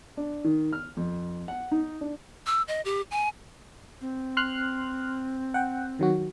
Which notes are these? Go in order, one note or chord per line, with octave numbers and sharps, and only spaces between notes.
D4
D#3
F6
F2
F#5
D#4
D4
E6
D#5
G4
G#5
C4
C6 F6 F#6
F#5 G5
D#3 F#3 F#4